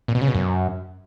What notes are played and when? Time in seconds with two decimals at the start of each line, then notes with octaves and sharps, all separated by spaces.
0.08 A#2
0.15 B2
0.21 C#3
0.28 B2
0.35 F#2